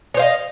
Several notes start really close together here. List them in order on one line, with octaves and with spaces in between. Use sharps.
C#5 C5 F5 D#5